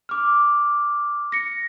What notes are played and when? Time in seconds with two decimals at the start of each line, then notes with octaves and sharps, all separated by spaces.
0.09 D6 F6
1.32 A#6 C#7